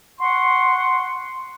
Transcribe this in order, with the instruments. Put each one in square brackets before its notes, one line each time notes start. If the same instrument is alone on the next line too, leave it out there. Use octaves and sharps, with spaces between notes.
[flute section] F#5 C6 C#6